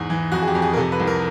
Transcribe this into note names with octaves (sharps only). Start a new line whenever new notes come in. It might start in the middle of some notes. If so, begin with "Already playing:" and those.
Already playing: E2 G#2
E3
F2 F#4
G#4
G4
F2
G#4
A#4
C3 A4
B4
C2
A#4